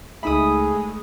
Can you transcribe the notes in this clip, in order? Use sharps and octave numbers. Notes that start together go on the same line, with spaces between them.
C#2 G#3 A3 D#4 G#4 E5 B5 D#6